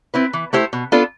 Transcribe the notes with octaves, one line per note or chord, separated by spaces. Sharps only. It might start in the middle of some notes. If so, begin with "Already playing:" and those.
C4 E4 B4
E3
A3 E4 G4 C5
B2
B3 D4 F4 A4